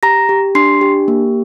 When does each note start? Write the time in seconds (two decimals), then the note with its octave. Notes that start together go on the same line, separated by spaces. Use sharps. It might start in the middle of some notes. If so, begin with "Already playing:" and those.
0.03 G4 A#5 A#6
0.29 G4
0.55 D4 C6 C7
0.81 G4
1.08 A#3